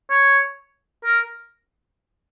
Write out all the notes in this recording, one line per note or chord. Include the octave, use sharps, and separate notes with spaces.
C#5
A#4